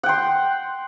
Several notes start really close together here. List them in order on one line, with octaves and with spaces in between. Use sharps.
F#5 G5 C6